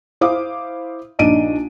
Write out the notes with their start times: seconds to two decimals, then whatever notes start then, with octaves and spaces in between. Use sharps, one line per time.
0.21 E4 C5 F5 D6 D#6
1.19 A#1 D4 D#4 D7 D#7